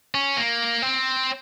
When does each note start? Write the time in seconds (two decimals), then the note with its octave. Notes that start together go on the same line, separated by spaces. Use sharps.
0.15 C#4
0.37 A#3
0.82 C4